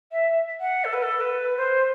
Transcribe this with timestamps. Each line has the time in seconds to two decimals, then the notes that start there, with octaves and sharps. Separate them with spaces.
0.12 E5
0.60 F#5
0.84 A4
0.93 B4
1.02 A4
1.20 B4
1.57 C5